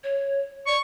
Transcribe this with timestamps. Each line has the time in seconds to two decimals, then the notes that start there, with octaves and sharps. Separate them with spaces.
0.04 C#5
0.66 D5 C#6